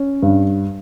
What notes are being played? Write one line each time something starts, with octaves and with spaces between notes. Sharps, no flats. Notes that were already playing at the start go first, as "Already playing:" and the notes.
Already playing: C#4
G2